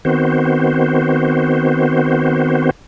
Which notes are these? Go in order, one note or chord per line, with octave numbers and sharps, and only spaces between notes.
D#3 B3 C4 F#4 C5